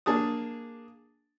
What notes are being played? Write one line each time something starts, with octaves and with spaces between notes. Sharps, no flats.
A#3 D4 G#4 A5 D#6